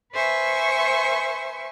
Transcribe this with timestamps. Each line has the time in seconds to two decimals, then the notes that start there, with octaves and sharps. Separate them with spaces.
0.13 B4 C5 E5 G#5 C#6